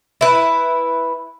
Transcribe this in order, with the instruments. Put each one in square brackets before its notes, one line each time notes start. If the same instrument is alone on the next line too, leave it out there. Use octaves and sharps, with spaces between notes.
[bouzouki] E4 B4